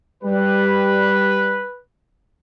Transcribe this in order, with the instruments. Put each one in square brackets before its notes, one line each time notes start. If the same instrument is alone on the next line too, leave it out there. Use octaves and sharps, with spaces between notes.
[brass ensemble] G3 [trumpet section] B4